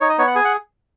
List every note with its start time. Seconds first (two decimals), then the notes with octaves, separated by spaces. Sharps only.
0.01 D#4 C#5
0.09 D#5
0.18 B3 C#5
0.27 F#5
0.35 G#4 G#5
0.45 F#5